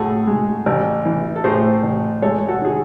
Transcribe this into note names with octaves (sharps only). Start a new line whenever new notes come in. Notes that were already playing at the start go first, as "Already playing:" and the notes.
Already playing: A2 F#4 G#4 A4
G#3
A1
E3
A4
A2 G#4 C5
A1
G#3 A4 C#5
F#4 A4
D#3 G#4